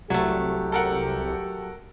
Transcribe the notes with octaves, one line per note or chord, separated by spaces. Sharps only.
C2 F#3 A3 G4
A4 A#4 F#5